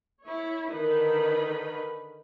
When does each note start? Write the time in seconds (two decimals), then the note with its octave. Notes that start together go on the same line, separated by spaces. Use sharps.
0.23 E4 C#5
0.72 D3 D#3 D#4 A#4 B4 B5